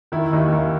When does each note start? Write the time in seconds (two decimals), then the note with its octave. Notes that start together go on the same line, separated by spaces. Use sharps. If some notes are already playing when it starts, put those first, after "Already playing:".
0.12 D#3 E4
0.33 D#2 D#4
0.53 D#2